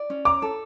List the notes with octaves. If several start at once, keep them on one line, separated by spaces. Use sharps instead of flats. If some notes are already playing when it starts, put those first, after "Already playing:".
Already playing: D5
C#4
A#5 D6
A4